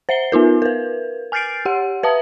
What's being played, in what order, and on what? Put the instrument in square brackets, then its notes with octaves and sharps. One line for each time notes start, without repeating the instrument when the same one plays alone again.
[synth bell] C5 E5 C7 G7
B3 D#4 F4 A#4
A#4 B4
G#5 F6 G6 A6 C7 D7
G4 F#5
B4 E5 A5 D#6